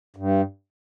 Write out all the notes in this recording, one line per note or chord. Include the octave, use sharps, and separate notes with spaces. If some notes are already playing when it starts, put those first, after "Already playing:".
G2